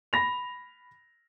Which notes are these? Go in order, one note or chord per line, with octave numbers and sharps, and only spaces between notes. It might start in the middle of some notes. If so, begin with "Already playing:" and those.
B5 A#6 F7